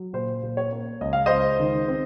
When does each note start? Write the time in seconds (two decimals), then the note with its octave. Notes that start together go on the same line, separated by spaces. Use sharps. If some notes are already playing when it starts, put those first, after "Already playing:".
Already playing: F#3
0.13 A#2 C5
0.42 A#2
0.57 C#5
0.72 A#3
1.01 C#2 D#5
1.13 F5
1.26 C#2 C5 D#5
1.60 D#3
1.88 C4